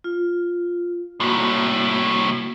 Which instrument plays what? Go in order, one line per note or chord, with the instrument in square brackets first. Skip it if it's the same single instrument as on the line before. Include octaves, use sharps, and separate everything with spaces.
[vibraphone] F4
[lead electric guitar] C2 A2 [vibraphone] A#3 F#4